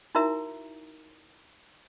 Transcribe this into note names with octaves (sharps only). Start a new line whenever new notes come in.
D#4 E4 F#4 A#4 E5 A#5